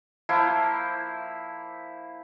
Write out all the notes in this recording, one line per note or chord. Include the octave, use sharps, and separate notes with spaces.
F3 A#3 E4 C5